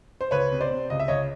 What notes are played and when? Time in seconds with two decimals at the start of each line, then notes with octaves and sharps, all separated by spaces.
0.21 C5
0.31 C#2 B4 C#5
0.51 C3
0.61 C5 D5
0.70 C3
0.90 C#2 D#5
1.00 E5
1.08 C#2 C#5 D#5